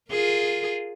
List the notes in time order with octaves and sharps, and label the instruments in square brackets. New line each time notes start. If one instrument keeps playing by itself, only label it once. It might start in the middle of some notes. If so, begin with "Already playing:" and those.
[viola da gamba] F4 G#4 A#4